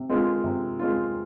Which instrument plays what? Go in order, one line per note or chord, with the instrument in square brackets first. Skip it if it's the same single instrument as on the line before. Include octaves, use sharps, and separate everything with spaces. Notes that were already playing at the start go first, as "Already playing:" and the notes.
Already playing: [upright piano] C3
G#3 C4 F4
C3
G#3 C4 F4